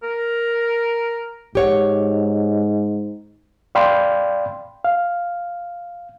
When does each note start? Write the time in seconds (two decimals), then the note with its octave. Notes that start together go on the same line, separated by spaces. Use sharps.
0.03 A#4
1.55 G#2 G4 C#5 F#5
3.75 D5 F5 G5 B5 C6
4.84 F5